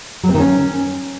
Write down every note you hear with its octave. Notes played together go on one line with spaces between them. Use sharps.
F#3
C4
D#3
C#4